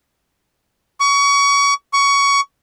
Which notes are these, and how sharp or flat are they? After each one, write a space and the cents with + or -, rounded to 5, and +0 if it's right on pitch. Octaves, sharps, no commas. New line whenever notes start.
C#6 +30
C#6 +20